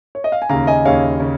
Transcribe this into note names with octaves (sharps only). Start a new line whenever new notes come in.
C#5
D#5
F5
G#5
D#2 C#3 F5 A#5
D#5 G#5
D#2 C#3 C#5 F5
C#3